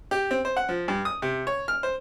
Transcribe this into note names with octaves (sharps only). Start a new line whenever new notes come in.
G4
C4
C5
F#5
F3
G2
D#6
C3
C#5
F6
C5